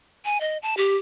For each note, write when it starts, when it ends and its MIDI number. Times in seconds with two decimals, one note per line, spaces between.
0.25 0.38 80
0.40 0.58 75
0.62 0.75 81
0.77 0.96 67